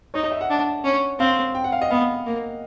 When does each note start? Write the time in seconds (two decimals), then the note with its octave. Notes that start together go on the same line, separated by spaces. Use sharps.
0.14 D#4 C#5
0.23 D#5
0.32 E5
0.41 F#5
0.50 D4
0.84 C#4
1.19 C4 F5
1.55 G5
1.64 F#5
1.72 F5
1.82 D#5
1.90 B3 F5
2.26 A#3